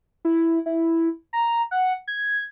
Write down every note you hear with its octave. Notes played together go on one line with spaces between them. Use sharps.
E4
E4
A#5
F#5
G#6